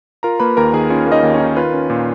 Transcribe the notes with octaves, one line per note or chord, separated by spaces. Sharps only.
F4 A#4 A#5
A#3 B4 B5
D#2 A#4 A#5
D#3 G#4 G#5
C#4 F4 C#5
A#3
D#4 D#5
D#2
C#4 C#5
D#3
F4 B4
C#4
A#2